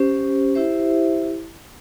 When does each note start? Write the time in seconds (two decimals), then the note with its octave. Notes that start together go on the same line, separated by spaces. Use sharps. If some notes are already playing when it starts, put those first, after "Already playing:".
Already playing: C#4 G4 C5
0.55 E4 G4 C5 E5